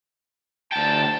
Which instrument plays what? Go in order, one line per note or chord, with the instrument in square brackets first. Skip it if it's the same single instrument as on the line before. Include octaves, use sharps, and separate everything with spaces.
[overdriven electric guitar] D2 G5 [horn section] A5